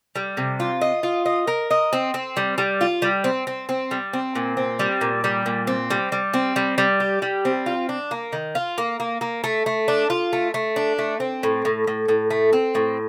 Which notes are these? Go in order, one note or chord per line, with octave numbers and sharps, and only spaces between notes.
G3
C3
F4
D#5
F4
D#5
A#4
D#5
C4
C4
G3
G3
F4
G3
C4
C4
C4
G3
C4
A#2
C4
G3
A#2
G3
A#2
C4
G3
G3
C4
G3
G3
G4
G3
C4
F4
D4
A#3
D#3
F4
A#3
A#3
A#3
A3
A3
D4
F4
A3
A3
D4
A3
C4
A2
A2
A2
A2
A3
C4
A2